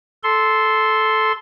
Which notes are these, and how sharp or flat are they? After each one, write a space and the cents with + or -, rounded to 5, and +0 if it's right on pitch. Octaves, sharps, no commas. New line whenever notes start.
A4 -10 C6 +0